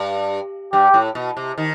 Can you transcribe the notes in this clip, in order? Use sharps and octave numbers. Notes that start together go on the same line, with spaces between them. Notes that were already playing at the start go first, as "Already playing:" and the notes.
Already playing: G2
G2 G4
A2
B2
C3
D#3